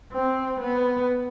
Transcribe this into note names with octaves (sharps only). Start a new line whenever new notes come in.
C4
B3